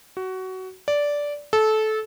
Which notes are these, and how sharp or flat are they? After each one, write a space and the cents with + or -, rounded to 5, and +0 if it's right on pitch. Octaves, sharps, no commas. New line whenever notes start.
F#4 +20
D5 -10
A4 -20